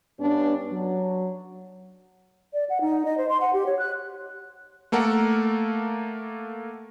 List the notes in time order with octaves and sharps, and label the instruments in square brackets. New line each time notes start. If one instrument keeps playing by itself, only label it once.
[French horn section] G2 B3 C#4 D4
F#3
[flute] D5
F#5
D#4
D#5
C5
C6
F#5
G4
C#5
F#6
[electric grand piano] A3 A#3 A4 A#4 F#5